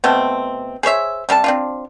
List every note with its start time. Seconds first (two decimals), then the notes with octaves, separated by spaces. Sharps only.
0.04 B2 A3 C4
0.83 G#4 C5 C#5 E5
1.29 C3 G3 D4 A5
1.44 C4 D4 F4